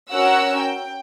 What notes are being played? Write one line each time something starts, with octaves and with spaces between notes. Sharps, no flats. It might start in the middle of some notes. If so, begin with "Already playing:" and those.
C#4 F#4 A#4 F#5 E6
G5